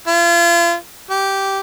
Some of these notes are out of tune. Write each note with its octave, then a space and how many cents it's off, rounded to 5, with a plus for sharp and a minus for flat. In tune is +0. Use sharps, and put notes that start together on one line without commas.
F4 -40
G4 -10